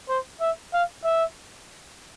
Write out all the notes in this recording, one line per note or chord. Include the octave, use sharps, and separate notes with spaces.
C5
E5
F5
E5